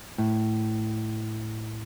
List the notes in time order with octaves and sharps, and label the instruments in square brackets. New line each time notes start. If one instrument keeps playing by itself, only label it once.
[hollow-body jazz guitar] A2